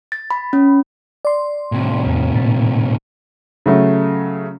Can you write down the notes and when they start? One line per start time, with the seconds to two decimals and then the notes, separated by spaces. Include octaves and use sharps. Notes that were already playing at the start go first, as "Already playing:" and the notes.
0.12 A6
0.31 B5
0.53 C#4
1.25 D5 C6
1.72 A2 C3
2.06 E2
2.36 A#2
3.66 C#3 F#3 A3